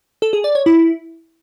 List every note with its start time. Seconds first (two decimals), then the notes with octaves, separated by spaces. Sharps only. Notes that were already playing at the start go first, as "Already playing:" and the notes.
0.22 A4
0.33 G#4
0.44 D5
0.55 C#5
0.66 E4